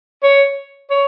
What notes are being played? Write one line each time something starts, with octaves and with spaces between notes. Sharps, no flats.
C#5
C#5